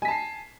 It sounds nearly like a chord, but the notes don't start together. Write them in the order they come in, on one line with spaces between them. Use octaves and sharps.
G#5 B6 A5 C7